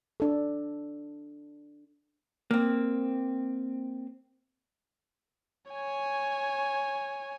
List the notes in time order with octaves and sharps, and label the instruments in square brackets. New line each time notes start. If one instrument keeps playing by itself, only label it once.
[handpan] D4 A4
[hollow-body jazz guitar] A#3 C4
[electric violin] C#5 G#5